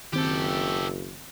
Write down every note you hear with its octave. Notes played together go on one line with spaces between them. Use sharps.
F#1 D#3 C4 G4 A4 G6